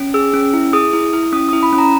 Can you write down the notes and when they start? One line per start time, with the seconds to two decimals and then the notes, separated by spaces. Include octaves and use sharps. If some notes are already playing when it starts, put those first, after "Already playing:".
Already playing: C#4
0.14 G#4 E6
0.34 C#4
0.53 E4
0.73 G#4 D#6
0.93 E4
1.13 E4
1.33 C#4 D#6
1.49 E4 D#6
1.63 B5
1.73 C#4
1.78 A#5